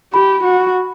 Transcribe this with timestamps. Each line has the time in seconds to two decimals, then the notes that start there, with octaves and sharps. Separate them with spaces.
0.14 G4 B5
0.44 F#4